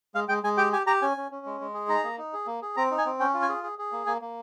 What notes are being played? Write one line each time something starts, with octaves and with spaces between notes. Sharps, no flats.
G#3 F5
G#3 G5
G#3 G#5
G4 G5
G4 G#5
G4 A#5
C#4 G#5
C#4
C#4
G#3
G#3
G#4
D#4 A#5
A#3
D#4
G#4
A#3
G#4
C4 A#5
D#4
G#5
C4
C#4 G5
F4
G#5
G#4
G#4
G#4
A#3
A#3 G#5
A#3